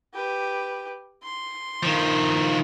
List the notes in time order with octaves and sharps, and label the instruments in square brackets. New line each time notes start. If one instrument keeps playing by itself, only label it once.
[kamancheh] G4 B4
C6
[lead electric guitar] D#3 F3